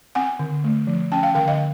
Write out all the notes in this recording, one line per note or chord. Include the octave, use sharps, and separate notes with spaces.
C4 F#5 G#5
D3
A3
F3
C#4 G5 A5
F5 G5
D3 F5 G5
D#5 F5